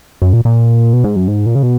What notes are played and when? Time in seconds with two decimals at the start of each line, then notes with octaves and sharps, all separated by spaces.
0.22 F#2
0.33 A#2
0.45 A#2
0.93 B2
1.04 G#2
1.16 F#2
1.28 G#2
1.46 A#2
1.55 C#3
1.63 B2